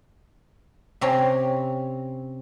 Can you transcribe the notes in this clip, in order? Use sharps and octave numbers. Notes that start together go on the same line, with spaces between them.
C3 C4 C#4 C#5 A#5